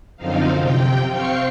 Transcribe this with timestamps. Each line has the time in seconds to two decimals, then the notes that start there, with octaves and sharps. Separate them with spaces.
0.17 F#2 D3 F3 C4 D#4 F5
0.58 C3 G5
1.08 C4 F5 G5 C#6 C7 C#7